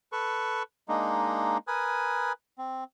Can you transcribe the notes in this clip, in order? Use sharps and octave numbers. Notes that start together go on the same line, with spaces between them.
A4 B4 C#6
G#3 A#3 D4 D#4
A#4 B4 G#5 D#6
C4